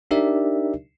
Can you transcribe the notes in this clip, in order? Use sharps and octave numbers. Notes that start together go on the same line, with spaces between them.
D4 D#4 G4 A#4 D5 E5